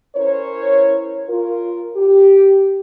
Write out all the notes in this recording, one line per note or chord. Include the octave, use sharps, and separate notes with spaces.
C#4 E4 A#4 C5 C#5
F4 A#4
G4